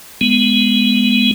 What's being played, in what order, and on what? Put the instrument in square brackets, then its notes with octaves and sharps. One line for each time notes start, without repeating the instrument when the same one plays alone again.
[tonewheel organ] G#3 B3